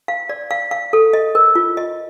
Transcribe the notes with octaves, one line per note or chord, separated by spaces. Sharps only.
F5
D5
F5
F5
A4
D#5
A#4
F4
D#5